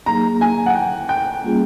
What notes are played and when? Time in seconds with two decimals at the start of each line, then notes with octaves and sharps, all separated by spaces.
0.06 F#3 A#3 D#4 G#4 A#5
0.41 G#5
0.66 F#5
0.75 G5
1.09 G5
1.44 G3 A#3 C#4 F4 G#4